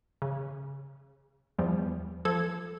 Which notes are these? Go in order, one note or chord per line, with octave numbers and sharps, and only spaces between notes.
C#3
E2 F3 G3
F3 A4 G#6